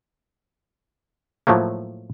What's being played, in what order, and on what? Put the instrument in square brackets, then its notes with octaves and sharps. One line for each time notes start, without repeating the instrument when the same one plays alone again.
[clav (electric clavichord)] A2 F3 F#3 A3 A#3